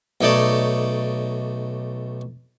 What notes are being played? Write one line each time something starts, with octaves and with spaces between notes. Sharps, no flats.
B1 A3 D#4 C#5 D5 A5